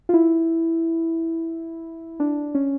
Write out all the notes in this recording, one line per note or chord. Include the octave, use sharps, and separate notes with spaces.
F4
E4
D4
C#4